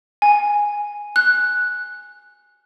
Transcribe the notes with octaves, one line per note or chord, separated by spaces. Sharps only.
G#5
F#6